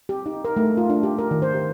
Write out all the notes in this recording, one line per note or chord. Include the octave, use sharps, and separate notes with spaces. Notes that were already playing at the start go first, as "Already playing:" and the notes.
G4
D#4
A#4
A3
F4
D4
G4
A#4
D#3
C5
G4